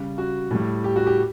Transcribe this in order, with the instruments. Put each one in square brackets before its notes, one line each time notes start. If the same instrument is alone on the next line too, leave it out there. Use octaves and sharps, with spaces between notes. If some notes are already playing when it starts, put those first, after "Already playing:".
Already playing: [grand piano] C#3 G3
F#4
A2 G3
G4
F#4
G4